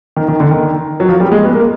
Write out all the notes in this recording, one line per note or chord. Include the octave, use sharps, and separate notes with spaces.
D#3
D#3
D3
D#3
F#3
F3
G3
G#3
B3
A#3